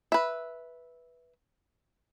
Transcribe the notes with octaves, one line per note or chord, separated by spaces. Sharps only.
B4 E5